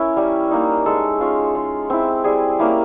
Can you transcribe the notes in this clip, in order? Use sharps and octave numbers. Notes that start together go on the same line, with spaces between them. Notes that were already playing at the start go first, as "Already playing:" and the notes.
Already playing: C#4 E4 A#4
G3
A#3 D#4
G#3 A4
C#4 F4
G#3
C4 E4
G3 G#4
A#3 C#4 E4 G4